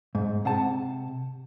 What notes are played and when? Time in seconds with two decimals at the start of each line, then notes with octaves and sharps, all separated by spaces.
0.15 G#2
0.45 C3 F#5 A5